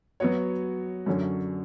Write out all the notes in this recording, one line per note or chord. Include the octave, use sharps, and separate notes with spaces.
F#3 B3 F#4 C#5
F#2 D3 F#3 C#4